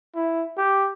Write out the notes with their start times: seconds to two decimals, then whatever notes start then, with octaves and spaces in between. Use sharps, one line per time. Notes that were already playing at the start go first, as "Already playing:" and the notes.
0.15 E4
0.58 G4